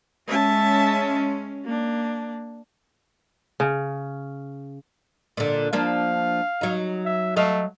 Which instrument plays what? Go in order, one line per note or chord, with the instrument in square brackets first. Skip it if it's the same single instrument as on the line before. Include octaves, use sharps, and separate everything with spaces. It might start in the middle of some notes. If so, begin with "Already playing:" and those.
[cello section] G#3 C#4 [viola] E5 A5
[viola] A#3 D4
[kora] C#3
[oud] A#2 D3
[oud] F3 A#3 D4 [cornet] F5
[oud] F#3 D#4
[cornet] E5
[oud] F#3 D#5 F5 [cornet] A3